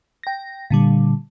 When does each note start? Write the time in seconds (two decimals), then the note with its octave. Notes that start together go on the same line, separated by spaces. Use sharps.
0.23 G5 A#6
0.70 A#2 D3 G3